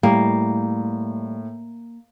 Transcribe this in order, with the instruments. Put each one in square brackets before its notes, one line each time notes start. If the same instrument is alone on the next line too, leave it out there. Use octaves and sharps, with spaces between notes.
[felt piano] A2 [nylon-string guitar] G3 [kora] A#3